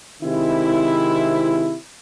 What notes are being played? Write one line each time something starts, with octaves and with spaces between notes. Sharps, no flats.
C3 D#3 G#3 C4 E4